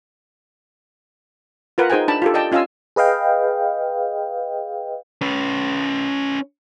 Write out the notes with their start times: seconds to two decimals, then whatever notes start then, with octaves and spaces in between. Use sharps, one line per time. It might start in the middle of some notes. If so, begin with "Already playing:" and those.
1.78 F4 A#4 B4 F#5
1.90 D#4 G#4 C5 G5 G#5
2.08 D4 A5 B5
2.22 F4 G4 A4
2.34 D5 D#5 G5 A5
2.52 C#4 F4 D#5 F5 G#5 E6
2.96 G#4 B4 D#5 F5 G5
5.21 C#4 B4